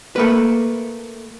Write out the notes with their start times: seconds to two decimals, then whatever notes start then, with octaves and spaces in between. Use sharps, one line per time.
0.16 A3 A#3 B4